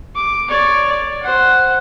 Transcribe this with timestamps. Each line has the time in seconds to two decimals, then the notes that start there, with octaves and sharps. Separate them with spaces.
0.15 D6
0.49 C#5 D5
0.89 D5
1.23 C5 F#5